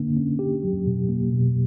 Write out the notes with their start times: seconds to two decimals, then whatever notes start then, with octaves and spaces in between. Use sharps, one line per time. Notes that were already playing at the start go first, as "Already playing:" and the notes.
Already playing: D3 A#3 D4
0.17 C#4
0.39 G4
0.63 F#3
0.86 B2
1.09 A#3
1.33 B2